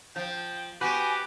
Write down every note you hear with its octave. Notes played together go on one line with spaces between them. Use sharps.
F3 G5
B3 F#4 G4 B4 G#5